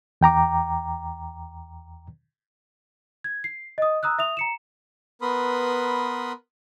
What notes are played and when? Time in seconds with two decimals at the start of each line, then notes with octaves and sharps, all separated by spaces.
0.21 E2 G5 A#5 D6
3.24 G#6
3.44 C7
3.78 D#5 D#6
4.03 A#5 D#6 E6 F#6
4.19 E5 D#6 F7
4.37 A#5 C#7 E7
5.22 B3 A#4 B4 B5 C6 D#6